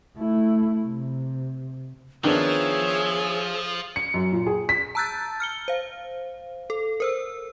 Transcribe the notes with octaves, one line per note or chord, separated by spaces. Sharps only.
A3 E4
C3
D#3 F3 B3 D4 G#4 C#5 E5
C#7
F#2
A#2
G#4
B6
A5 A#5 E6 F#6 G6 A6
F6 C#7 G7
C5 F5
A4
A#4 C5 E6